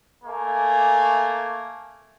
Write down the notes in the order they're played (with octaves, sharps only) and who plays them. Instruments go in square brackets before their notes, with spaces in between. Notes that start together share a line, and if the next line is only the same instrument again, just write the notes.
[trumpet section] A3 A#3 G#5